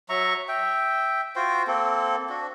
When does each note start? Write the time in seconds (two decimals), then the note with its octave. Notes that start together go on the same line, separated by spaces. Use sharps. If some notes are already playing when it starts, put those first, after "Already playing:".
0.09 F#3 E5 A#5 C#6
0.48 E5 G5
1.36 F4 F#4 C5 G5
1.67 A#3 C4 A4
2.30 D4 F#4